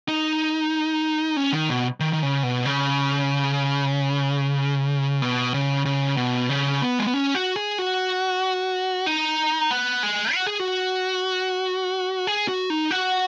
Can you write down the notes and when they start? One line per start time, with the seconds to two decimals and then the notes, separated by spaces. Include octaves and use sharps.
0.08 D#4
1.37 C#4
1.52 D#3
1.69 B2
2.00 D#3
2.13 D#3
2.23 C#3
2.43 B2
2.65 C#3
5.22 B2
5.54 C#3
5.85 C#3
6.17 B2
6.49 C#3
6.82 B3
6.99 G#3
7.06 B3
7.14 C#4
7.35 F#4
7.56 G#4
7.78 F#4
9.06 D#4
9.71 B3
10.03 G#3
10.34 F#4
10.47 G#4
10.59 F#4
12.27 G#4
12.48 F#4
12.70 D#4
12.91 F#4